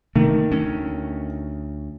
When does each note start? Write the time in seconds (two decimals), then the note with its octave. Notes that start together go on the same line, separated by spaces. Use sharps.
0.16 D#3 A3 A#3
0.51 D2 C#4